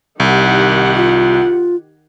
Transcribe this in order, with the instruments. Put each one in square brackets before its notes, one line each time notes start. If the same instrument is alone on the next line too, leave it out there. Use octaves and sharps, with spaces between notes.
[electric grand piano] C2 [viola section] D#3 G4 F#5
[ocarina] F4